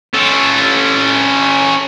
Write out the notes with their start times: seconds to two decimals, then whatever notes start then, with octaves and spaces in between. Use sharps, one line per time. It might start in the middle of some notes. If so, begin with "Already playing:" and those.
0.14 C#4 A4